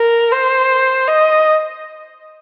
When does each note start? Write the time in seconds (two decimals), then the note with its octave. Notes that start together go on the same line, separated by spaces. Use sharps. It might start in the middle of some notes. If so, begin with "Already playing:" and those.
Already playing: A#4
0.31 C5
1.08 D#5